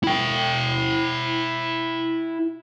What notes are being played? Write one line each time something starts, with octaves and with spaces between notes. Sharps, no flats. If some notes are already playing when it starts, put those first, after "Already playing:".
E4 G5